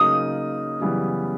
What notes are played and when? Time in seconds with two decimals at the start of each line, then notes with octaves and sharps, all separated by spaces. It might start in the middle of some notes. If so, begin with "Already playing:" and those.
Already playing: C#3 F#3 A#3 D#4 D#6
0.80 F#2 C#3 E3 G3 B3